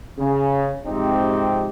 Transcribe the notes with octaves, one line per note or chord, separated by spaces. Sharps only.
C#3
G#2 C3 F3 C4 D#4 G4